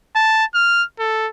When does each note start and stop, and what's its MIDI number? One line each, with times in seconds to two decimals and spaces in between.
0.15 0.45 81
0.54 0.84 89
0.99 1.28 69